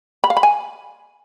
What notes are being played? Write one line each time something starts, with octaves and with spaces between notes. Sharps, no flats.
B5
F5
B5
G#5